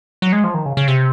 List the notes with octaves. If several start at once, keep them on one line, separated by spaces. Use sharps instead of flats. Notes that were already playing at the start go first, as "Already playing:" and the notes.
F#3
G#3
F3
D#3
C#3
C#3
C3